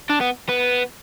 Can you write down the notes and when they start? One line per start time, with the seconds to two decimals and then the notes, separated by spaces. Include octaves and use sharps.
0.10 D4
0.21 B3
0.49 B3